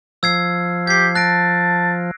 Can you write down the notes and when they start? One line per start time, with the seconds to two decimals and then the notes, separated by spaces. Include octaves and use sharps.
0.23 F3 E6 G#6 C7
0.87 G4 G#6 C7
1.15 A5 F#6 A#6 D7